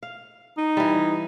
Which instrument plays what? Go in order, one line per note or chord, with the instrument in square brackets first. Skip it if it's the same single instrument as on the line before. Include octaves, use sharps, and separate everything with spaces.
[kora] F5
[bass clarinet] D#4
[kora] E3 G3